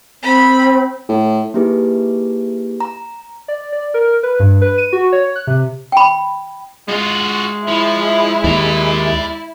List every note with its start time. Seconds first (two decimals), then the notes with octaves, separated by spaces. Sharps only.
0.23 C4 B5
1.09 A2
1.54 A#3 D#4 E4 G4 G#4 B4
2.80 A#5
3.48 D5
3.72 D5
3.94 A#4
4.23 B4
4.40 G2
4.61 B4
4.78 D#7
4.93 F#4
5.12 C#5
5.36 F#6
5.47 C3
5.92 G5 B5
6.88 G#3 F4 F#4
7.68 F3 E4
8.44 D#2 D5 A#5